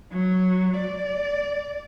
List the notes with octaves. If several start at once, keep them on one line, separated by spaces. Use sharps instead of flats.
F#3
D5